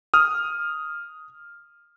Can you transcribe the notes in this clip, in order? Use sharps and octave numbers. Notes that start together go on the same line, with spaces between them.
D#6 F6